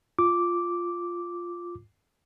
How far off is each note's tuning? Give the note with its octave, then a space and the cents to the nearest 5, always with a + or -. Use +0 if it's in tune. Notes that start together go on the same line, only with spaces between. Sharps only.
F4 +0 D6 -5